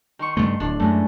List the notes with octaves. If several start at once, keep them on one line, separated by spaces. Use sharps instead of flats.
D#3 C6 C#6
G2 C#3 A3
D1 D4
F#2 E3 G#3 A3